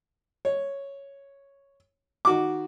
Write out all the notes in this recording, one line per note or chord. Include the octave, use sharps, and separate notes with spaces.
C#5
D#3 F#4 D6